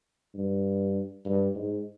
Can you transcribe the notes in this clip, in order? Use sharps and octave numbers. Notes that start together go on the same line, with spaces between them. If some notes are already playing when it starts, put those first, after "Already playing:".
G2
G2
G#2